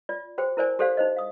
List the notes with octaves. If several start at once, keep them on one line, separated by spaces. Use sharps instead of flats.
F4 D5
F#4 G#4 C5 G5
E4 A#4 C5 D5 G#5
G4 A4 C5 D5 F5
D#4 C5 D#5
F5 D#6